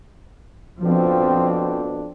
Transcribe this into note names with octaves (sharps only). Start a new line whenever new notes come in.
F2 B2 F3 C4 D4